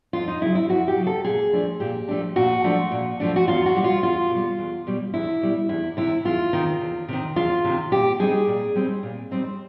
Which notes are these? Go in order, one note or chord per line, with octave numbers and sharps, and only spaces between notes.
F2 F4
D#4
C#3 F#3 E4
E4
F2 F#4
G4
C#3 F#3
A4
A#2 G#4
F3 A3 D4
A#2 G4
F3 A3 D4
A#2 F#4
F3 A3 D4
A#2
F3 A3 D4
F#4
E2 F4
F#4
B2 G3
F4
E2 F4
B2
G3
E2
B2 G3
E2 E4
B2 G3
E2 E4
C3 D#3 E4
E2 F4
C3 D#3
E2
C3 D#3
E2 F4
C3 D#3
A#2 G4
G3 C4 D#4 G#4
A#2
G3 C4 D#4
A#2
G3 C4 D#4